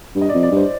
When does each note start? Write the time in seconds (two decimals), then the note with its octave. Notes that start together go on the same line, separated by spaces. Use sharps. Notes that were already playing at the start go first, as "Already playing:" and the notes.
0.15 G2
0.21 D#5
0.29 D5
0.34 F2
0.43 D5
0.51 G2
0.57 C5